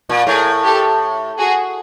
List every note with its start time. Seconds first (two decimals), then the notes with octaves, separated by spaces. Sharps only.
0.09 A#2
0.27 A2 G#4 A#4
0.64 G4 A4
1.39 F#4 G#4